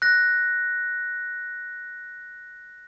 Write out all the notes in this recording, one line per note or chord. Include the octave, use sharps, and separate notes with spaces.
F#6 A#6